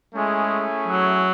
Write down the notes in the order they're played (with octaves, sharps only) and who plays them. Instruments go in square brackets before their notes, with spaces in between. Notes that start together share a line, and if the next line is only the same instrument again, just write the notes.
[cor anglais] G#3 [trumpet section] A3 C#4 E4 G#4
[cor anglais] F#3